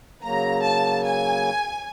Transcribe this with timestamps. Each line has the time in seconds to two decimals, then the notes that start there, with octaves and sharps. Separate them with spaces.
0.22 C#3 F#3 A#3 A#5
0.62 A5
1.02 G#5